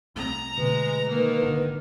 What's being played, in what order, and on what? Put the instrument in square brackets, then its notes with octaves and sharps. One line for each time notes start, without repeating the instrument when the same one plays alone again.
[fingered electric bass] C2 A3 C4 [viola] A#5
[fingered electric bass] B2 D3 A3 [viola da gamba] G#3 [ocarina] B4
[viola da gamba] D#3 [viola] A#3
[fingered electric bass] G#1 D3